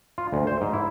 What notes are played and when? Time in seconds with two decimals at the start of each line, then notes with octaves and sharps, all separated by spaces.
0.18 F4
0.32 D2
0.47 C5
0.61 G#2
0.73 E4